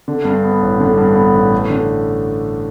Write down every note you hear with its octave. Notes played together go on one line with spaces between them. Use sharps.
D3
G2
B3
A1
D3
G2
B3
A1
A3
D3